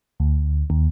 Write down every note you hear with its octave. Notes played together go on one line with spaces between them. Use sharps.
D2
D#2